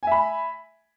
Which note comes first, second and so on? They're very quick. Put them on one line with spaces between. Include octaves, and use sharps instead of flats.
G#5 E5 B5